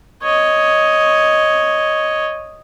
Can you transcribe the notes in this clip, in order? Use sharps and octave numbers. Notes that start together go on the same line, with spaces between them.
C#5 D#5